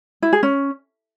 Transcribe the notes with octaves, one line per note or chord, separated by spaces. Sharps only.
E4
G#4
C#4